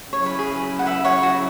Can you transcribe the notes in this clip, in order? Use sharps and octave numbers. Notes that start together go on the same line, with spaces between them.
C#3 F#3 E4 C#5
B4
G#4
B4
F#5
B4 E5
C#5 F#5
F#4